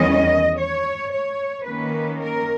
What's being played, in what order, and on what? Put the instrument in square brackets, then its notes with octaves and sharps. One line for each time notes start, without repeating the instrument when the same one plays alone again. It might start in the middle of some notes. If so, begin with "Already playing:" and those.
Already playing: [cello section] E2 D#3 G3 C#4 D#5
C#5
C#5
D#3 A#3 C#4 B4
A#4